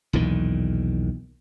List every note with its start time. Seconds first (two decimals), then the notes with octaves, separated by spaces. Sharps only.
0.13 B1 E2 A#2 D#3